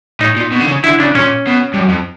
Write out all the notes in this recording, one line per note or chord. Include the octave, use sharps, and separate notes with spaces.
A2 D#4
A#2
B2
D3
C#3
D3 E4
C#3 D4
A#2 C#4
B2
G2
F#2
F2